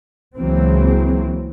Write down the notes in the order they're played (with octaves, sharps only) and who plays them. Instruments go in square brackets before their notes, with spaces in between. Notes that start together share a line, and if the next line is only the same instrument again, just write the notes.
[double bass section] C#2 E3 F#3 A#3 C4